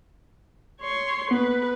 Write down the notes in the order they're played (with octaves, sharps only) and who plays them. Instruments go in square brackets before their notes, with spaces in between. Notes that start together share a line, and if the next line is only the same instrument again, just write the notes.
[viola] C#5 C6
[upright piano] B3 [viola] B4